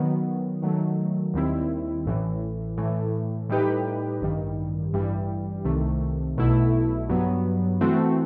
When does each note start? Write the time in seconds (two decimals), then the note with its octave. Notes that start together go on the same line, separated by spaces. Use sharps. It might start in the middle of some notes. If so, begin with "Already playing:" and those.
Already playing: D#3 F#3 B3
0.62 D#3 F#3 A3
1.34 D#2 D#3 G3 C4 E4
2.06 A1 A2 E3
2.77 A2 E3 A3
3.49 A2 G3 D#4 G4 B4
4.21 A1 G2 D#3 G3
4.93 A1 G2 E3 G3
5.65 C2 C3 D#3 A3
6.37 B1 B2 A3 E4
7.09 G2 F#3 B3
7.81 E3 A3 C4 F#4